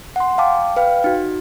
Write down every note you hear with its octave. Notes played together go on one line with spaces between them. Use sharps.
F#5 C6
F5 G5 A5 D6
B4 F5 G5
D#4 F#4